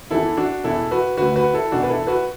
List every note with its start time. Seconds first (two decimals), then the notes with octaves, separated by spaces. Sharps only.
0.10 E2 E3 E4 A4
0.37 D4 F#4
0.64 E2 B2 E4 A4
0.91 F#4 B4
1.17 D2 D3 F#4 B4
1.36 F#4 B4
1.53 E4 A4
1.72 E2 B2 D4 F#4
1.83 B4
1.90 E4 A4
2.07 F#4 B4